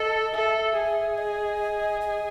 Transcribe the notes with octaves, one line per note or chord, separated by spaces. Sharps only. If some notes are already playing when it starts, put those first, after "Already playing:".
Already playing: A4 D#5
A4 E5
G#4
D#5
D#5